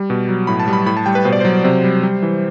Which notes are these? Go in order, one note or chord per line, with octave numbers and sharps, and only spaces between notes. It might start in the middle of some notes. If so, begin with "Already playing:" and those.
Already playing: G3
B2
F#3
A2 B5
A5
G3
B5
A2 B5
A5
G3 G5
B4
B2 C5
D5
F#3 C5
C3 C5
G3
G3
E3